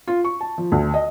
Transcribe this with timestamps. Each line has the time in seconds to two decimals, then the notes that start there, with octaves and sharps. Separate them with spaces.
0.07 F4
0.24 C#6
0.41 A5
0.58 F3
0.72 D2
0.94 D#5